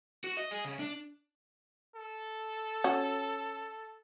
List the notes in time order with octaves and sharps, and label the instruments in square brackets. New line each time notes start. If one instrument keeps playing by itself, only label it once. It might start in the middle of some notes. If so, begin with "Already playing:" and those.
[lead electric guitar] F#4
D#5
G#4
C#3
D4
[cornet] A4
[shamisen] C#4 F#4